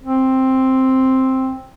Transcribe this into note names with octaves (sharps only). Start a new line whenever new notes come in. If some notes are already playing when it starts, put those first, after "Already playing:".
C4